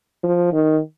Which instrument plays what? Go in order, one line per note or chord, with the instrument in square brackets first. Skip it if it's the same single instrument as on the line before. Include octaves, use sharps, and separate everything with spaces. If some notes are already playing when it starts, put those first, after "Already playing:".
[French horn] F3
D#3